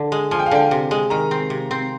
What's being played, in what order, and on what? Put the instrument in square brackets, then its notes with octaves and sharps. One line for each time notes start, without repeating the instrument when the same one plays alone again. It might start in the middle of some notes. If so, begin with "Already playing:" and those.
Already playing: [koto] D3
G#3
[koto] F3 [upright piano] G#5
[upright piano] G5
F5
[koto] D3 [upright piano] G5
[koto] C3
G#3
[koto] D#3 [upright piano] A#5
[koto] C4
C3
C4